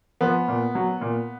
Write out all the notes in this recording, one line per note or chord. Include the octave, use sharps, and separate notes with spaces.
F3 B3
A#2
F#3
A#2